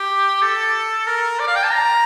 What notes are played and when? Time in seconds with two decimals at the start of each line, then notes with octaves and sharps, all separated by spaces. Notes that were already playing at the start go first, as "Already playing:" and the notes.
Already playing: G4
0.43 A4
1.07 A#4
1.40 D5
1.47 F5
1.56 G5
1.64 A5
1.72 A#5